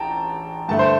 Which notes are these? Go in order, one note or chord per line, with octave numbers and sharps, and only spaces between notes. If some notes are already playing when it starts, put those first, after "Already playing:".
Already playing: A1 G5 A5 A#5
G2 D3 A3 A5
C5